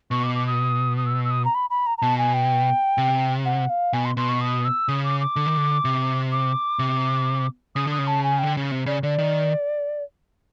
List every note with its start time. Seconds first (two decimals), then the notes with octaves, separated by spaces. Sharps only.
0.11 B2 C#6
0.23 D6
0.35 D6
0.47 D#6
0.97 D#6
1.06 E6
1.25 E6
1.31 D#6
1.45 A#5
1.55 B5
1.70 B5
1.86 A#5
1.98 A#5
2.02 B2 A5
2.18 G#5
2.34 G5
2.98 C3
3.45 F#5
3.70 F5
3.93 B2 G#5
4.05 C6
4.17 B2 C6
4.29 C#6
4.41 D#6
4.65 E6
4.88 C#3 D#6
5.04 D6
5.20 D6
5.36 D3
5.47 D#3
5.57 D3
5.85 C3
6.32 D6
6.79 C3
7.75 C#3 D#6
7.87 D3 D#6
7.98 C#3
8.07 A5
8.23 G#5
8.39 D3 G5
8.57 C#3
8.71 C3
8.86 C#3 D5
9.03 D3 D5
9.18 D#3